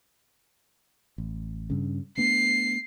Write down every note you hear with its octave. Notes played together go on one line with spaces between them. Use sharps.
A1
G2 C#3
A3 B3 D4 C7